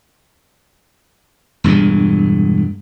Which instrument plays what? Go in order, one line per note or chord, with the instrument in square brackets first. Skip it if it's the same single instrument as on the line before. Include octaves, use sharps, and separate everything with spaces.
[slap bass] E1 G2 A#2 G#3